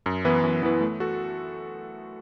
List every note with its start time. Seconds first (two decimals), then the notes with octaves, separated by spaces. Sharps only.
0.06 F#2
0.25 E3 B3 E4 B4
0.43 F#2
0.63 E3 B3 E4 B4
0.81 A3
1.00 F#4 A4